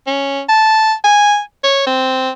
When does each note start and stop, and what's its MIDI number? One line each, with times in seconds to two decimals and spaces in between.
0.07 0.42 61
0.49 0.93 81
1.04 1.40 80
1.64 1.84 73
1.87 2.31 60